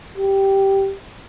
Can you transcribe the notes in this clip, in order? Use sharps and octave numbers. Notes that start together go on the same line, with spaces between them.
G4